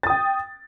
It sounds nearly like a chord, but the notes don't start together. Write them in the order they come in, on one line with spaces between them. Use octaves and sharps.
A6 D#6 G5